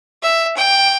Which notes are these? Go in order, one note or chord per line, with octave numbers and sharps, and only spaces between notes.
E5
G5